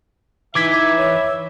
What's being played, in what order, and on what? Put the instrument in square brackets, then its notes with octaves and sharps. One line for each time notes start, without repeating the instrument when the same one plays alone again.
[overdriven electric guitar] E3 [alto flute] D#4 [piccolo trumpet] E5 [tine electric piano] D6 G#6 B6
[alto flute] C#5